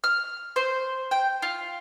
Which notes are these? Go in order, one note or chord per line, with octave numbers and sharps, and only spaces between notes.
F6
C5
G5
F4